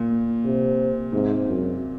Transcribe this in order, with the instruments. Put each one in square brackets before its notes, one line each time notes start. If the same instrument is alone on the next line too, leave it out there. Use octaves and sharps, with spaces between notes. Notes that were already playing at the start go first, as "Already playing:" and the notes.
Already playing: [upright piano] A#2
[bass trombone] C3
[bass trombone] G#2 [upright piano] C3
[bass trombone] F#2